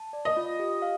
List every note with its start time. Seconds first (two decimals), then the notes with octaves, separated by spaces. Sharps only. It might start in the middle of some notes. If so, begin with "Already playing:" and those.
Already playing: A5
0.13 D5
0.25 D#5
0.37 F4
0.60 G4
0.82 F5